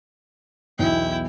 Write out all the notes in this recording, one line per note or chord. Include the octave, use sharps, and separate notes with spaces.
B1 E2 E4 G5